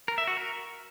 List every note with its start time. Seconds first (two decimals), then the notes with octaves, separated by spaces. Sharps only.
0.08 A#4
0.18 E5
0.27 F#4
0.37 A#4